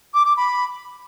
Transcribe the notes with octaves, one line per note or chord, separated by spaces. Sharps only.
D6
D6
B5